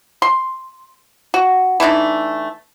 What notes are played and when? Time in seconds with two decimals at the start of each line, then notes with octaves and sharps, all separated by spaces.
0.22 C6
1.34 F#4
1.80 E3 A3 D4 D#4